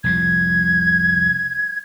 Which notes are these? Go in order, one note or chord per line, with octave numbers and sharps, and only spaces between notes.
F1 C2 F3 G#6